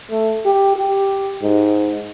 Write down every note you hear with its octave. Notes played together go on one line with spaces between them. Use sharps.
A3
G4
G4
G#2